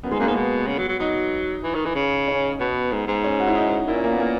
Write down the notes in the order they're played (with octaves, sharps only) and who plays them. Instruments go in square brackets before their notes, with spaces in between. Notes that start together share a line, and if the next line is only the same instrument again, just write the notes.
[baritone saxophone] F#2 [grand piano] B3
[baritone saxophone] G#2 [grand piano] G#3
[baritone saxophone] F#2 [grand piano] A#3
[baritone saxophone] G#2 [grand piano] B3
[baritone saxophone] B2
C#3
F#3
F#3
[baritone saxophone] F#3 [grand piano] D#4
[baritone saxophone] E3
D#3
E3
C#3
[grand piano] C#4
[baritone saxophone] B2 [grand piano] B3
[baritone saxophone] G#2
G#2
[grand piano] C#4
F#4
E4
D#4
[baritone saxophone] A#2 [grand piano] E4
[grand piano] C#4
A#3
B3
A#3